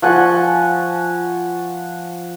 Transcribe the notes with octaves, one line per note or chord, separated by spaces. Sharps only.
F3 F#5 G#5 C#6